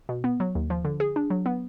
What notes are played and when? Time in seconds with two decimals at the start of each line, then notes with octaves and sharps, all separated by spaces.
0.09 B2
0.24 B3
0.40 F#3
0.55 D#2
0.70 F3
0.85 D3
1.00 G#4
1.16 D4
1.30 F#3
1.46 B3